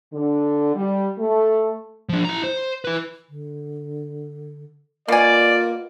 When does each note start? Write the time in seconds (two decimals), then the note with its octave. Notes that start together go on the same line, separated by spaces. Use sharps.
0.13 D3
0.75 G3
1.19 A3
2.09 F3 D4
2.25 E4 A#5
2.44 C5
2.85 E4 B4
3.29 D3
5.08 B2 A#3 F4 D5 G#5